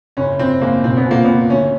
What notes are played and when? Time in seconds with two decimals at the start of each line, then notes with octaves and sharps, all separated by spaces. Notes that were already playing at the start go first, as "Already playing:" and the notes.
0.17 F#1 C#4
0.39 F#1 C4
0.61 F#1 A#3
0.83 B1 C4
0.97 B3
1.06 A#2 A#3
1.24 A#2 B3
1.50 D2 C#4